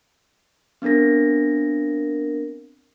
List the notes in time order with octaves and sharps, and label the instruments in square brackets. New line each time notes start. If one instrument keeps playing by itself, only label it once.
[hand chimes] B3 C4 D4 A#4 A#6